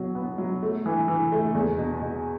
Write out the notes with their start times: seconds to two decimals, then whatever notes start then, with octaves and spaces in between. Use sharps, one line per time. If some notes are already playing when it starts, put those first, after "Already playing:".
Already playing: B2 F#3
0.15 B3
0.38 F#3
0.63 A3
0.86 E3
1.08 E3
1.32 A3
1.54 E2
1.78 B2
2.01 B2